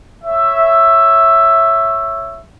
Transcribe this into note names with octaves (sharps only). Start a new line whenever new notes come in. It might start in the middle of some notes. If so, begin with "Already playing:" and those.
C#5 E5